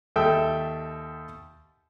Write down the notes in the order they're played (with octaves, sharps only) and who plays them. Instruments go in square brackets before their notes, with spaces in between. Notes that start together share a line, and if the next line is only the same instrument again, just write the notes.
[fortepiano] D#2 A4 E5 G5 E6